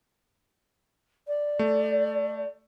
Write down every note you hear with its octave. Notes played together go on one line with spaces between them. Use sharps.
D5
A3